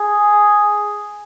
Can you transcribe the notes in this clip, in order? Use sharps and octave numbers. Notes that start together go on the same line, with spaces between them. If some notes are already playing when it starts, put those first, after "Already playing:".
Already playing: G#4